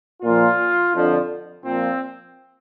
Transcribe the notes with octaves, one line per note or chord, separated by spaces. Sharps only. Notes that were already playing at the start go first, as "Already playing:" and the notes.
A#2 F3 F4
F2 D3 F3
A#2 F3 C4